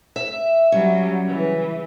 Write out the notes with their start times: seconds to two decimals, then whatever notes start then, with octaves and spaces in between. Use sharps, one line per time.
0.16 E5
0.72 F#3 G3 C#4
1.23 C#3 E3